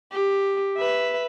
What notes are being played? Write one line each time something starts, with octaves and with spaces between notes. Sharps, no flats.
G4
B4 E5